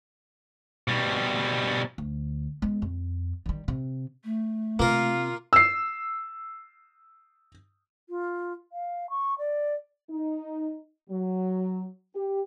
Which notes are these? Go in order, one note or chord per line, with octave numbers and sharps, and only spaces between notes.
B2 G3
D2
G#3 B3
F2
D#3 G3
C3
A3
C3 A#3 F4 A#4
E6 C7
F4
F5
C#6
D5
D#4
F#3
G4